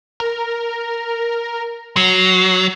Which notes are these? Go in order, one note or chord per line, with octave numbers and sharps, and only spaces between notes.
A#4
F#3 C7